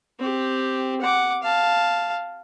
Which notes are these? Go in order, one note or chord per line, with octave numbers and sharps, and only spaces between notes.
C4 G4
F#5 D6
F5 A5